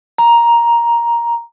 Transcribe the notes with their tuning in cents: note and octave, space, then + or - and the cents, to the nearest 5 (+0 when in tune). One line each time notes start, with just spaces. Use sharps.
A#5 +10